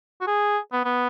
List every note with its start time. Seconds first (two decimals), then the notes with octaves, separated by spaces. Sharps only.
0.21 F#4
0.27 G#4
0.72 B3
0.85 B3